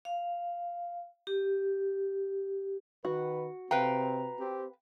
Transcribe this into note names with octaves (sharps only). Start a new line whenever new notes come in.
F5
G4
D#3 F#4 B4
C3 C4 B4 F5 G5 A#5
C4 G4